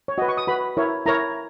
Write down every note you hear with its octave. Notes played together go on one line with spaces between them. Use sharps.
C#5
F#4 B4 D#5
C#6
D#6
F#4 B4 B5
E4 A#4 C#5
E4 A#4 C#5 A#5